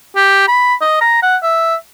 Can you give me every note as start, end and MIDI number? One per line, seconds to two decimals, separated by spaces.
0.16 0.47 67
0.48 0.75 83
0.82 0.99 75
1.01 1.20 82
1.23 1.36 78
1.43 1.75 76